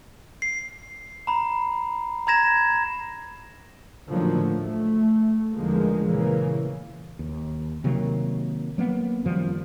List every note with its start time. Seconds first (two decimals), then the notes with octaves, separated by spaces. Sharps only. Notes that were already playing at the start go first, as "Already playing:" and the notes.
0.42 C7
1.27 A#5 B5
2.27 A#5 B5 G#6 A#6 E7
4.11 A2 D3 D#3 F3 F#3 A#3
4.56 A3
5.55 E2 D3 D#3 F3 G#3 A#3
6.08 A#2 C#3 E3 A#3
7.19 D#2
7.84 C3 D#3 F#3 A#3
8.78 F#3 A#3 B3
9.24 F#2 D#3 F3 G3